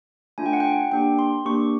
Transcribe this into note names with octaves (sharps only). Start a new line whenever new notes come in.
A3 D4 F4 G#5
G5
F#5
G5
A#3 D4 G4 G5
C6
A#3 D4 G4 C#6